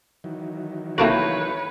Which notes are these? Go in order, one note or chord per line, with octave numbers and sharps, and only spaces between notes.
D#3 E3 F#3
A3 A#3 C4 D#4 E4 F#4 B4 C#5